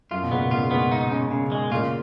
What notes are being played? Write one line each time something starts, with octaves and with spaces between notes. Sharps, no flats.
F#2 F4
B2
A#2 C#3 B3
A#2 C#3 F4
C#3
G#2 B2 B3
D#4
C#3
C#3
G#3
A#2 C#3 F4